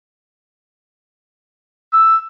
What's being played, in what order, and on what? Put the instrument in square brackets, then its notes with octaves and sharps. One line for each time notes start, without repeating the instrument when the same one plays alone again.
[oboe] E6